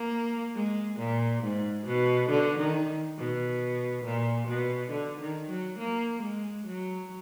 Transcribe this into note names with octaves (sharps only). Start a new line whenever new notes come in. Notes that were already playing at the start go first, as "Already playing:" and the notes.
Already playing: A#3
G#3
A#2
G#2
B2
D3
D#3
B2
A#2
B2
D3
D#3
F#3
A#3
G#3
F#3